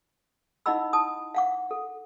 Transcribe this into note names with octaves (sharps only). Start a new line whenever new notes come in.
D#4 E4 D#5 F#5 B5 E6
A5 D#6
F5 F#5 D6
A4